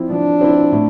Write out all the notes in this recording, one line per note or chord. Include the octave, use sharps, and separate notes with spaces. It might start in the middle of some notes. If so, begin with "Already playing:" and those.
Already playing: F3 C4 E4
F3 D4
C4 E4
A2